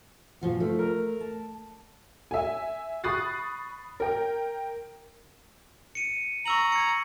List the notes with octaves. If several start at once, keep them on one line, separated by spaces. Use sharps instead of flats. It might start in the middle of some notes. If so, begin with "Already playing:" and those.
A#2 F3 F#4
F3 A3
A#4
A5
E5 G#5
B5 C#6 D#6 F#6 A6 C7
A#4 G5
C#7 D#7
A#5 C#6 E6 F#7
G#6 C#7